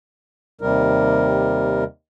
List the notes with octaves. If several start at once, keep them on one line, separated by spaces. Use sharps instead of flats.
D#2 C3 G3 A#4